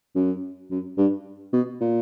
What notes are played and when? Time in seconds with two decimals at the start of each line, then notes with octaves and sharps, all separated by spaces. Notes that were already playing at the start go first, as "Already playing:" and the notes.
0.15 F#2
0.71 F#2
0.98 G2
1.53 B2
1.81 A#2